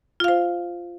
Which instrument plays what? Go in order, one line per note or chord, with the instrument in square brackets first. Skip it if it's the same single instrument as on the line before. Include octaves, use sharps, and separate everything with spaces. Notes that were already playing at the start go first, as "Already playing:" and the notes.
[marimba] F4
F5
C5